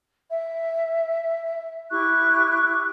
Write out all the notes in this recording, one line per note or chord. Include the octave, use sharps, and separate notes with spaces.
E5
E4 G4 C#6 F#6